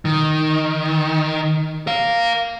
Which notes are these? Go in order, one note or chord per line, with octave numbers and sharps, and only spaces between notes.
D#3
A#4 F5